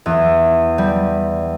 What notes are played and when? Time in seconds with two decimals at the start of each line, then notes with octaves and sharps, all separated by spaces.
0.06 E2
0.78 G3